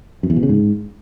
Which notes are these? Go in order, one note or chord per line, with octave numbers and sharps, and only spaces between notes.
F#2
E2
B2
C#3
G#2